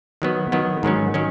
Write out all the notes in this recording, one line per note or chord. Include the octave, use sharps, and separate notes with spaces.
D#3 F#3 B3
D#3 F#3 B3
G#2 D#3 F#3 C#4
D#3 F#3 C#4